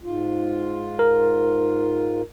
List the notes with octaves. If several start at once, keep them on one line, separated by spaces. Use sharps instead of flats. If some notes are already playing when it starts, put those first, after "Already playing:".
G#2 F4
A#4